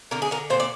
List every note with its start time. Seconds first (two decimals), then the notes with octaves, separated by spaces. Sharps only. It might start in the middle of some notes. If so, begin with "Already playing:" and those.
0.11 D3 A#4
0.22 G#4
0.31 D3 A#4
0.50 A#2 C5
0.60 D5